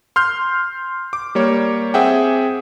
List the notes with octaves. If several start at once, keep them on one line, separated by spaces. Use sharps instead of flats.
C6 F6 G6
D6
G3 A#3 C#5
C4 G#4 E5 F#5 G5